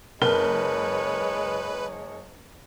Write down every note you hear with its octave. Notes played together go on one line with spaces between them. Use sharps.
F#1 G#3 A#4 B4 C#5